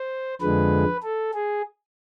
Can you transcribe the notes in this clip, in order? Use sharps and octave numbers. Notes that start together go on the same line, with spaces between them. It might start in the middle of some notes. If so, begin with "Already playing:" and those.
Already playing: C5
F2 D3 F3 G#3 B4
A4
G#4